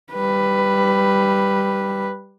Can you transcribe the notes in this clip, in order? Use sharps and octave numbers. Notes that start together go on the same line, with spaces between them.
G3 B4